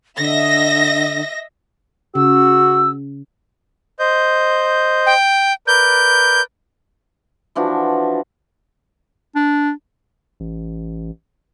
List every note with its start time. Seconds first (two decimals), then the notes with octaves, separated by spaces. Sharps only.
0.18 D3 D#5 E5 A#6
2.15 C#3 F#4 E6
3.99 C5 D#5 G6
5.06 G5
5.67 A#4 B4 D5 G6
7.55 E3 F3 D4 F#4
9.35 D4
10.40 A1